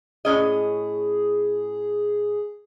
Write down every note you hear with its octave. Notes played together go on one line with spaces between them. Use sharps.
A2 C#4 G#4 D#5